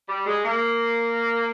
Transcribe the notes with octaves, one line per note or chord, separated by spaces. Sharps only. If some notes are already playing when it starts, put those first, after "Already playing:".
G3
G#3
A#3